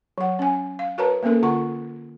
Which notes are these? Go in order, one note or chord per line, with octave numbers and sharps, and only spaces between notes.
F#3 F#5
C#4 G#5
F5
F#4 A#4 B4 C#5 A5 A#5
A#3 B3 C#4 A4 A#4
D3 F4 F#5 C#6